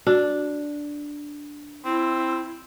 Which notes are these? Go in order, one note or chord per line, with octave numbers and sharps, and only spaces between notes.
D4 F#4
C4 E4